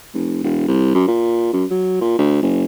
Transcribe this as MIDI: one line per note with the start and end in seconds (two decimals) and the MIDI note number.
0.14 0.40 29
0.44 0.65 28
0.68 0.92 36
0.95 1.06 42
1.08 1.52 46
1.53 1.65 42
1.70 1.99 54
2.01 2.18 46
2.19 2.38 38
2.42 2.65 30